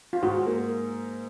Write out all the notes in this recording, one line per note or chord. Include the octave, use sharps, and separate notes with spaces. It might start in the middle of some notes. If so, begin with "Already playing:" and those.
F4
G#2 F#4
A#3